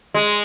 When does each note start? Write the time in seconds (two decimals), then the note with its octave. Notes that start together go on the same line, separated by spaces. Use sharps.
0.14 G#3